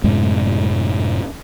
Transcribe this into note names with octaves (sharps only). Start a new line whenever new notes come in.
F#2 A2 C3 G#3